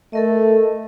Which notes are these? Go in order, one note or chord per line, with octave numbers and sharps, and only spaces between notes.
A3 A4 A#4 D#5